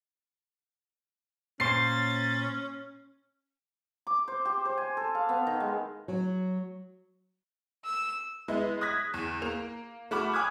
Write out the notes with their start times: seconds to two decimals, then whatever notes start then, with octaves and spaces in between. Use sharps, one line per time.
1.60 A#2 C#4 C5 A6 C7
4.07 D6
4.28 C5
4.45 G4
4.65 C5
4.78 G#5
4.97 A4
5.15 F5
5.29 B3
5.47 D#3
5.60 G#3
6.08 F#3
7.85 E6
8.48 G#3 B3 E4
8.81 D#6 F#6 G#6 A#6 B6
9.14 E2
9.42 A#3 F7
10.11 A3 F#4 B5 D6 F6
10.34 G#5 D6 D#6 F6 F#6 G#6